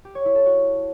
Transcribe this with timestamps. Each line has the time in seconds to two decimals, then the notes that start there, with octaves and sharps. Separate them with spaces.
0.05 G4
0.15 C#5
0.25 E4
0.36 A4
0.46 F#4